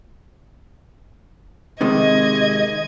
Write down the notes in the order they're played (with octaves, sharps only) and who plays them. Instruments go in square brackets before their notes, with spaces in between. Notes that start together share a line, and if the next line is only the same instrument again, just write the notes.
[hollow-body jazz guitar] C3 D#3 G#3 [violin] D#5 G#6